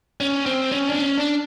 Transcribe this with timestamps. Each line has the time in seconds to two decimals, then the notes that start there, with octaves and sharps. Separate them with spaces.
0.20 C#4
0.46 C4
0.72 C#4
0.87 D4
0.99 C#4
1.18 D4